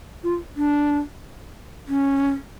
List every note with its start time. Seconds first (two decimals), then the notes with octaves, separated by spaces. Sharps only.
0.24 F4
0.57 D4
1.88 C#4